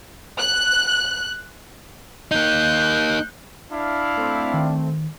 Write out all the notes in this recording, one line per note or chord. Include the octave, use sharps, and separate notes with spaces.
F#6
A#3 D#4 F#6 G6
D4 E4 F5
A3 C4
D#3